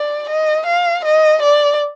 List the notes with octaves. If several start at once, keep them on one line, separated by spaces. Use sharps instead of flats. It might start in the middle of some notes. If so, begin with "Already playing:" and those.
Already playing: D5
D#5
F5
D#5
D5